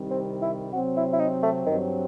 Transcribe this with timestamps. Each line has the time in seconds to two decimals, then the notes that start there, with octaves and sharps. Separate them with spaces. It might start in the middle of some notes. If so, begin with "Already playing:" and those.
Already playing: C2 C3 D#3 G3
0.11 C4
0.42 E4
0.73 C3 F#3 C4 F#4
0.96 E4
1.13 E4
1.19 D#4
1.43 A3
1.66 G2 D#3 F#3 C4